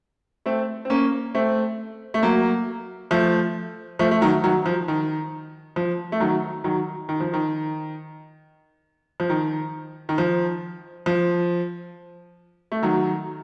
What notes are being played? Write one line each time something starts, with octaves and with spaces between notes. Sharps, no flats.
A3 C4
C4
A#3 C#4
A3 C4
A3
F#3 A#3
F3 A3
F3 A3
A3
D#3 F#3
D#3 F#3
F3
D#3
F3
A3
D#3 F#3
D#3 F#3
D#3
F3
D#3
F3
D#3
D#3
F3
F3
A3
D#3 F#3